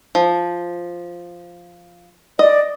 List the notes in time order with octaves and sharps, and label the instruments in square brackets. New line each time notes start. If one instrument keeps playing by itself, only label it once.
[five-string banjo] F3
[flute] D5 [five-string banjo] D#5